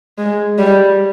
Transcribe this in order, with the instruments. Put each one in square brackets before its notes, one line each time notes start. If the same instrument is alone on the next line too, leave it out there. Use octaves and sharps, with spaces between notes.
[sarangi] G#3
G3